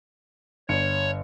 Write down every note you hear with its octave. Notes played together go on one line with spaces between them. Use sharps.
G1 C#5 C#7